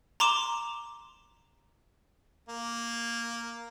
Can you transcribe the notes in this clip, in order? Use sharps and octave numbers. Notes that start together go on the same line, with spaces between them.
A#5 C6 D6 E7
A#3